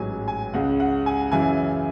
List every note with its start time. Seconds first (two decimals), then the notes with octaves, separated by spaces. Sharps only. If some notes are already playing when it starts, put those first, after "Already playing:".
Already playing: A1 G#2 F#3 G#5
0.28 G#5
0.54 C#2 C#3 G#3 F#5
0.80 F#5
1.06 G#5
1.32 F#2 C#3 E3 G#5